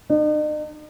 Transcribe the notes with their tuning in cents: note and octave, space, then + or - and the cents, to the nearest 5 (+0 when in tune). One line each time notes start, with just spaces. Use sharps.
D#4 -45